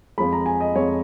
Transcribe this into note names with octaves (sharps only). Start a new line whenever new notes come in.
F2 F3 G#3 B5
A#5
G#5
D#5
F2 F3 G#3 C#5